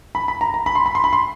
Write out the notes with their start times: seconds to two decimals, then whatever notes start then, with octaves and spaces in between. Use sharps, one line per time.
0.15 B5
0.28 B5
0.41 A#5
0.54 A#5
0.66 B5
0.75 C6
0.86 B5
0.95 C6
1.04 B5
1.13 C6